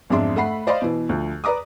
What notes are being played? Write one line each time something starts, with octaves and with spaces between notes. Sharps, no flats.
B1 F2 G#2 D4 E5 C6
A3 E5 F#5 B5 C7
C5 D5 D#5 F5 B5 C6
B2 E3
D2 F3
B4 D5 A#5 D6 D#6